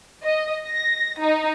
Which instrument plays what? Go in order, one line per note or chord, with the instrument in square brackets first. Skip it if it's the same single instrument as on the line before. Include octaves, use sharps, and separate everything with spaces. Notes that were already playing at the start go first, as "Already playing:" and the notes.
[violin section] D#5
A#6
D#4